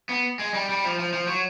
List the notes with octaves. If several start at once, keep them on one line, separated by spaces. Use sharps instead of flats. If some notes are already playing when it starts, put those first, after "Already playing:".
B3
G#3
G3
G3
F3
F3
F3
F#3